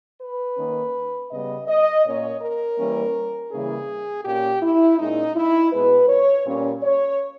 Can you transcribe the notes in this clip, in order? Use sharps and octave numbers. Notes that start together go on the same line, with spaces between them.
B4
D#3 A#3 C#4
C#3 G3 B3 D#5
D#5
A#2 A#3 C#4 C#5
A#4
E3 G3 A#3 C#4
C#3 E3 G3 A#3 C#4 G#4
A#2 A#3 C#4 G4
E4
A#2 G#3 C#4 D#4
E4
B2 G#3 B3 B4
C#5
A#2 G3 A#3 C#4
C#5